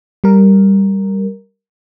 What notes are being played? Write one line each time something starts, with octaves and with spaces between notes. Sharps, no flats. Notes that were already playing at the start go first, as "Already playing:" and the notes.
G3 A#4